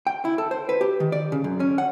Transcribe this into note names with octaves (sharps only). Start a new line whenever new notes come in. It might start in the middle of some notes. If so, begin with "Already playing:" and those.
G5
E4
A4
C5
B4
G4
D#3
D5
C#3
F#2
C#4
F#5